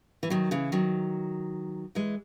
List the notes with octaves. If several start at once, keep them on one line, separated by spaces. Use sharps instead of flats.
E3
D#3 F#3
C#3 E3
D#3 F#3
E3 G#3